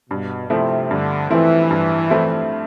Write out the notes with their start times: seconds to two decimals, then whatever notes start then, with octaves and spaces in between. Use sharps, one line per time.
0.10 G2 B2
0.50 C3 F3 A3 C4 E4
0.91 G2 D3
1.30 E3 F3 A3 C4 E4
1.71 G2
2.10 F3 A3 C4 E4